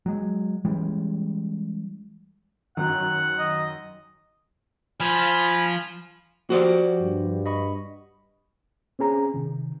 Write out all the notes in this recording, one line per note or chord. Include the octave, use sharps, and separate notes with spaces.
F#3 G#3
E3 G3 G#3 C#4
F#2 D#3 F#5
D#5
F3 G#5 B5 F6
F3 F#4 G4 C5 D5
G2
D#5 B5 C#6
C4 C#4 G#4 A#5
C3 D#3